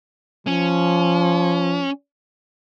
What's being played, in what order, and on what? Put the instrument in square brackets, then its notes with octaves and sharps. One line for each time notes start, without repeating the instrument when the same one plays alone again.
[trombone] F3 [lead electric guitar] C#4